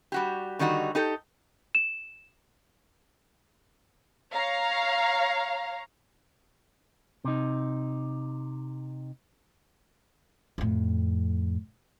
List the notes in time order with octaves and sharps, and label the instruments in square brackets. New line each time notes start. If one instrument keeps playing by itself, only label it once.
[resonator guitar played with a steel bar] G3 F#4 G4
D3 D#3 G3 D#4 F#4
D#4 G4 A4
[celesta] E7
[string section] C#5 F5 A#5
[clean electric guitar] C3 D#4
[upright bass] F2 A2